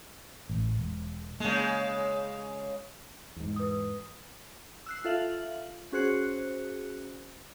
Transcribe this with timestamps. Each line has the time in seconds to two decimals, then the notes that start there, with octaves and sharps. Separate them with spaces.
0.50 A1
0.77 E1
1.40 C#3 G#3 A#3
3.36 E2 G#2
3.56 B4 D#6
4.86 E6 F#6 C7
5.04 F4 A4 E5 F5 F#7
5.92 C#4 F#4 G#4 C5 F#6 C#7